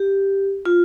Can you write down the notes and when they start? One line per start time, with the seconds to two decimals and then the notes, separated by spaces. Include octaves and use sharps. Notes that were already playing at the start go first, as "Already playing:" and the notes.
Already playing: G4
0.66 F4